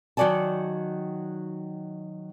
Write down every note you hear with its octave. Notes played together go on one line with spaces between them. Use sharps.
D#3 F#3 F#4 D5 G#5 A5